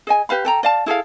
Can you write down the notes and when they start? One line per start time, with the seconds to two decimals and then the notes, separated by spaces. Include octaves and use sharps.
0.07 G#4 D#5 G#5
0.29 G4 B4 F5 B5
0.45 A4 G5 A#5
0.63 D5 F5 A5
0.86 E4 G#4 A4 F5